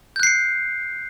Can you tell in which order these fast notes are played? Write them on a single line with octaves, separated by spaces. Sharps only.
G6 F#6 C7 C#7